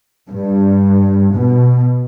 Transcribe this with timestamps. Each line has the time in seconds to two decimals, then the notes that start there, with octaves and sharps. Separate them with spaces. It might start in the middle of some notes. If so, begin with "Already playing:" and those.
0.29 G2
1.32 B2